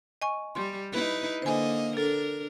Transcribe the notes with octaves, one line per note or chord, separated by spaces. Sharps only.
D#5 G#5 C#6
G3 C6
D#4 E4 B4
D3 A#3 C5 D#5 G#5
D4 A4 A#4